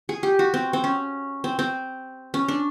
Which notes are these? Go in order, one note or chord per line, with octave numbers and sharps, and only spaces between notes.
G#4
G4
F#4
C4
C4
C#4
C4
C4
C#4
D4